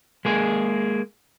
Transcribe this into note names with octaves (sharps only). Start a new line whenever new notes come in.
G#3 A#3 G#4